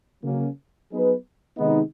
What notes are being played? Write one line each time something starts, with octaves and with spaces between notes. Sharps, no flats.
C#3 F#3 A#3 C#4
F#3 B3 D#4 G#4 B4
C3 D#3 G#3 B3 D#4